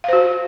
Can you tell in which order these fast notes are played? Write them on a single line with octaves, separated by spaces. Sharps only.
F5 C5 F#4